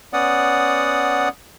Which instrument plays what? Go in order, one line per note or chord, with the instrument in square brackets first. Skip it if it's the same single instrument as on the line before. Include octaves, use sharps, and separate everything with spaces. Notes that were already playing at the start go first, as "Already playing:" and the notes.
[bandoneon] B3 C#4 D5 F#5 D#6